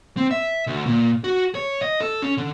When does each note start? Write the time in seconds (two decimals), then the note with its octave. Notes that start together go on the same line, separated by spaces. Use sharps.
0.17 C4
0.31 E5
0.67 D2
0.86 A#2
1.24 F#4
1.55 C#5
1.82 D#5
2.01 A4
2.22 C#4
2.37 D3